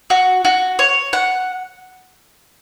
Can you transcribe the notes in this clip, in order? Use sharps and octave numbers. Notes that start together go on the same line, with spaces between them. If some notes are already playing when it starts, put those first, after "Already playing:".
F#4
F#4
C#5
F#5